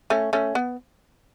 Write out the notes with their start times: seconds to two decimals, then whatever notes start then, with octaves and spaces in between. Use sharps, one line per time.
0.10 A3 C#4
0.33 A3 C#4
0.55 B3